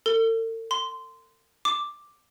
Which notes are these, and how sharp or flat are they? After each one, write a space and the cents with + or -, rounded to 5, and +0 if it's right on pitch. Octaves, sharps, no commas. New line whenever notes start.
A4 +45
C6 -15
D6 +5